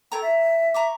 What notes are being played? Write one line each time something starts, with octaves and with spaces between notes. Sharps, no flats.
A4 C#5 G5 A#5
E5
A#5 C#6 D6